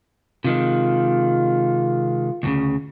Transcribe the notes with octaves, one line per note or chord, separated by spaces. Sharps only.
C3 D#3 G#3 F4
D2 A2 C#3